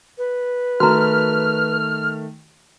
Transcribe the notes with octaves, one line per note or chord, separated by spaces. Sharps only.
B4
D#3 A3 F#4 A#5 F6